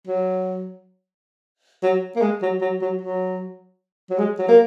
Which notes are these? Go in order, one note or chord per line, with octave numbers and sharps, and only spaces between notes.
F#3
F#3
A#3
G#3
F#3
F#3
F#3
F#3
F#3
G#3
F#3
A#3